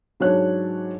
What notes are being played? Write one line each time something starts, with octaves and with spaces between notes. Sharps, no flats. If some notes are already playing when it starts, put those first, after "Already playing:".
G#2 F#3 D4 C#5 F#6